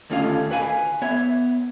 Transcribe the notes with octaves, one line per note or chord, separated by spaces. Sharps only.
D#2 D3 A3 C#4 F4 F5
B4 F5 G#5
B3 C#5 E5